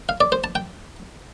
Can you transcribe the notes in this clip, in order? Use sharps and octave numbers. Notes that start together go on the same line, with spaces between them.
F5
D5
C5
A5
G5